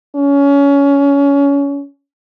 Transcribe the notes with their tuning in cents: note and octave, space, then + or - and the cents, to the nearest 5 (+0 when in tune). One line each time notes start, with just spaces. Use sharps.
C#4 +25